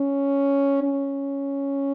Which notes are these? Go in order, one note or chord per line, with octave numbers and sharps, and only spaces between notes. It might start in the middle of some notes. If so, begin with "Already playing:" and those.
Already playing: C#4
C#4